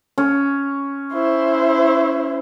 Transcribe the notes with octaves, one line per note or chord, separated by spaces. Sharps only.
C#4
E4 C5